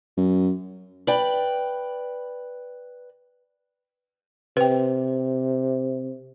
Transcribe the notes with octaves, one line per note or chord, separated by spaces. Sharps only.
F#2
B4 D5 G5
C3 B4 G5